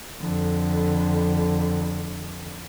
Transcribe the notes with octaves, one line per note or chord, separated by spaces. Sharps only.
F2 D3